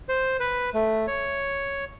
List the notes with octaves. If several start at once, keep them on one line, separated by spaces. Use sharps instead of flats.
C5
B4
A3
C#5